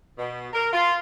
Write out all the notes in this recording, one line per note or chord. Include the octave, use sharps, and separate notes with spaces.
B2
A#4
F4